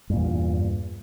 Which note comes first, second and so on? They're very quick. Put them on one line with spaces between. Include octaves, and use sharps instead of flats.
G2 A#2 E2